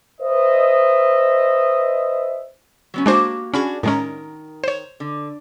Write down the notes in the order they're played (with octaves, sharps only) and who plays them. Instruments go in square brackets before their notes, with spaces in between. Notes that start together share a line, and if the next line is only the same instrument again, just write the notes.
[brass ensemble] B4 C5 D#5 E5
[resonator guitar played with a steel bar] F#3 B3 C#4
[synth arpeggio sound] G#3 D4 C5 [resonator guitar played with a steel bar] A#3 F#4 G4
[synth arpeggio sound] C#4 B5 C#6 [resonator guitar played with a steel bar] D4 F#4 G#4
[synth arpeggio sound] A2 G#3 C#4 [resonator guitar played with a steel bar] D#3 A#4
[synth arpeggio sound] C5 C#5
[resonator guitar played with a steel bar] D3